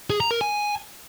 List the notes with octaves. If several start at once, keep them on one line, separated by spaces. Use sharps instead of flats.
G#4
A#5
A#4
G#5